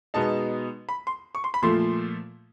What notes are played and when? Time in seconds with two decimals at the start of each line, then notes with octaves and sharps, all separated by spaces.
0.14 B2 G#3 B3 D#4 A5
0.89 B5
1.07 C6
1.35 C#6
1.44 C6
1.54 B5
1.62 A#2 F3 A3 C6